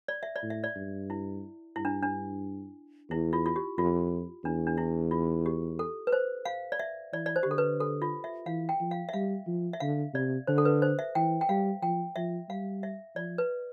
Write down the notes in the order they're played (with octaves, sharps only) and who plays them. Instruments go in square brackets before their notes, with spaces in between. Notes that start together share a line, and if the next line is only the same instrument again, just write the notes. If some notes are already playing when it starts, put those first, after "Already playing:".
[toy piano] D5
E5
D5
[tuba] A2
[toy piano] E5
D5
[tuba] G2
[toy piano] E4
[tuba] G2 [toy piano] E4
[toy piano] D4
D4
[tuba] E2 [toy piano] E4
[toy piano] F4
F4
G4
[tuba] F2 [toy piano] F4
[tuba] E2 [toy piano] D4
[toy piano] D4
E4
F4
G4
A4
B4
C5
F5
D5
E5
[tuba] E3 [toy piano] D5
[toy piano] D5
C5
G4
[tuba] D3 [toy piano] A4
[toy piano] B4
A4
F4
E5
[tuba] E3 [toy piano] F5
[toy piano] G5
[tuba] F3
[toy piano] F5
E5
[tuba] G3 [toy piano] F5
[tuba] F3
[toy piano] E5
[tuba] D3 [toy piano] F5
[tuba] C3 [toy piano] D5
[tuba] D3 [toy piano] C5
[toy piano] A4
B4
C5
E5
[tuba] E3 [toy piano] G5
[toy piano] G5
[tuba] G3 [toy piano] F5
[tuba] F3 [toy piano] G5
[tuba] F3 [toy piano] E5
[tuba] G3 [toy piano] F5
[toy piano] E5
[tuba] F3 [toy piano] D5
[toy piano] B4